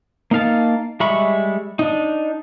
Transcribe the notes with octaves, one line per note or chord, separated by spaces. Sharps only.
A#3 D#4 F5 A5
G3 G#3 E5 B5 C#6
D4 D#4